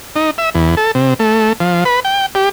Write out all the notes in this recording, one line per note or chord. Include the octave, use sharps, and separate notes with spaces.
D#4
E5
E2
A4
C3
A3
F3
B4
G5
G4